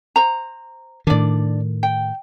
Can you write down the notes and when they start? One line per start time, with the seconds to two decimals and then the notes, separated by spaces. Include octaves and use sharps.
0.16 C5 A#5
1.07 A2 D#3 D4 D5
1.83 G5